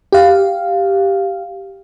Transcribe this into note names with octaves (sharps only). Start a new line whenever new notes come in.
G4 F5